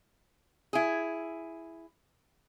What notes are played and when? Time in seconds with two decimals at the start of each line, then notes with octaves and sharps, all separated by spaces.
0.73 E4 G#4